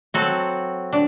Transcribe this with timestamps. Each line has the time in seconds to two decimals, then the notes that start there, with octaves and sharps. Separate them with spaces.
0.14 F#3 C4 F#4 A4
0.93 D4